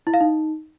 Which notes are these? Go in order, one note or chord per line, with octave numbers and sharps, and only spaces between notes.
E4
F5
D#4